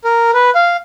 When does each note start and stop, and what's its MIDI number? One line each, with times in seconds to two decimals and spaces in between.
0.04 0.31 70
0.34 0.50 71
0.55 0.77 77